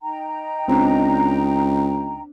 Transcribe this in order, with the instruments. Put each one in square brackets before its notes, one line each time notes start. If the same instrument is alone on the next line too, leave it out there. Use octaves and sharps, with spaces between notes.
[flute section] D#4 G5 A#5
[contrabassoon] C#2 [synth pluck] C4 D4